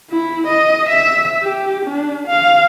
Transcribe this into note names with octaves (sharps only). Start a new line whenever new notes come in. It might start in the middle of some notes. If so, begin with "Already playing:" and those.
E4
D#5
E5
G4
D4
F5